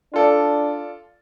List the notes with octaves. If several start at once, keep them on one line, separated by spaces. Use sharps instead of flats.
D4 F4 A4 D5